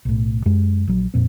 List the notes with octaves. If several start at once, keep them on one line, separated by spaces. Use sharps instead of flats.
B1 A2
F#2 G#3
A#1 F#3
F2 A#2 C4